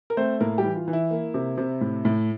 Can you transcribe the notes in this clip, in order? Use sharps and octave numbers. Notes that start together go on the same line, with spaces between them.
A#4
A3 C4 C5
A2 A#3 A#4
G3 G4
E3
F4
E3
E4
A#3
C3
C3
A2
A2